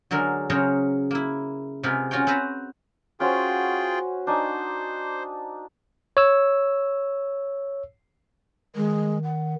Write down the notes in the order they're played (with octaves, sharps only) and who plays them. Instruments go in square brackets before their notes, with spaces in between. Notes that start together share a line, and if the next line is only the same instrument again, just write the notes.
[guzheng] D3 F#3 G#3 A#4
C#3 F#3 A#4 C5 C#5 D#5
A#3 E4
C3 G#3 B3 F4 A#4 B5
C#4 F4 F#4 C#5 G5
C4 F#4 B4 C5 A#5
[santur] C#4 F#4 C5 [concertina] F4 G#4 G5
[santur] D4 D#4 G#5 [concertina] C5
[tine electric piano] C#5 E6
[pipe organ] D#3 [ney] G#3
[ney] F#5